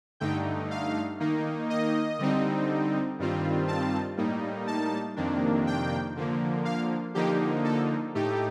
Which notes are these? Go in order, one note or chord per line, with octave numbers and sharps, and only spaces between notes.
G2 D3 A3 D#4 G5
F5
D#3 A#3 D#4
D#5
D3 G3 C4 D#4
G2 D#3 G3 C4 F4
A5
A2 G3 A#3 D#4
A5
F2 C3 D#3 A#3 D4
G5
D3 F3 A#3
F5
D3 F3 A#3 D#4 G4
A4
A2 A3 D#4 G4